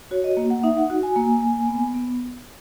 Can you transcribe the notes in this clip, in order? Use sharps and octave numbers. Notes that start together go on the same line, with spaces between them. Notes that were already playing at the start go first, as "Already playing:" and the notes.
F#4 C#5
D#5
A#3
F#5
D#4 E5
F#5
F#4
G#5
A#3
A#3
B3
B3